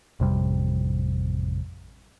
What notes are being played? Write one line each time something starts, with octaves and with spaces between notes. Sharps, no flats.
A1 F2 C3 G3